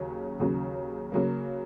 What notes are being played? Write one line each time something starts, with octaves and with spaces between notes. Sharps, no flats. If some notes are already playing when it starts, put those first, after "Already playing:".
Already playing: D#2 C#3 F#3 C#4
D#2 C#3 F#3 C#4
C#3 F#3 A#3